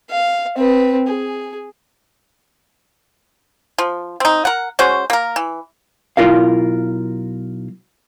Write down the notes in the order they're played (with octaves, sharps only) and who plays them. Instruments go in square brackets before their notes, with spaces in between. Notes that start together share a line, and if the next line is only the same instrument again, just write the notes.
[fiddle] F5
C4 B4
G#4
[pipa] F3
C4 D#4
A#4 F#5
G#3 C#4 F#4 C5
A#3 A#4
E3
[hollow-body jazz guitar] B1 G#2 E4 F4 A#4 F5